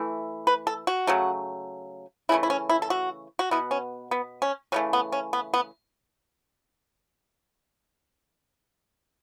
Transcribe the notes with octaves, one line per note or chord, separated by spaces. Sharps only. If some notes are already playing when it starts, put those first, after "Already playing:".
Already playing: E3 A3
B4
A4
F#4
C#3 F#3 A3
C#3 E3 A3 E4
E4
C#4
E4
A4
F#4
F#4
B2 B3 E4
C#4
B3
C#4
C#3 E3 A3 C#4
B3
C#4
B3
B3